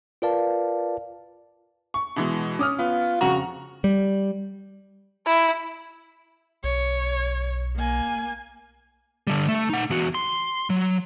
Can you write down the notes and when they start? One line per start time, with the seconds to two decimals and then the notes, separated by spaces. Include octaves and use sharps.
0.22 F4 A#4 B4 D5 F5 A5
1.94 C#6
2.16 B2 E3 G#3
2.59 C#4 D6 D#6 F6
2.79 B3 F4
3.21 F2 C#3 F#4 A#5 C#6
3.84 G3
5.26 E4
6.64 B1 C#5
7.76 A#3 G#5
9.27 D3 G3
9.48 A3
9.69 D#4 F#5
9.90 E2 F#4
10.15 C6
10.70 F#3